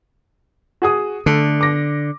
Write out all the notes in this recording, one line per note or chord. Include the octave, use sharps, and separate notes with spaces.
F#4 G#4 D#6
D3 A3
D6 A#6